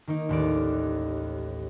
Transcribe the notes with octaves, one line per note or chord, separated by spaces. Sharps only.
D#3 A#3 D#4
A1 D#2 D5